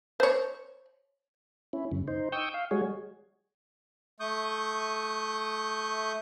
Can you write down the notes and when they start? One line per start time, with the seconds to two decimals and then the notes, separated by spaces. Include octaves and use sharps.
0.20 C5 C#5
1.73 C#4 E4
1.92 F#2 C#3
2.08 D#4 C5
2.32 G5 C#6 D#6 E6 G6
2.54 F5
2.71 G3 G#3 F#4 G#4 C#5
4.20 A3 C#6 D#6 G6